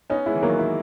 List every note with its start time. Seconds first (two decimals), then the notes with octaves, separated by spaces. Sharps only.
0.10 B3 C#4 D#4
0.26 G#3 B3 E4
0.35 E3
0.43 D#3 F#3 A#3
0.59 E4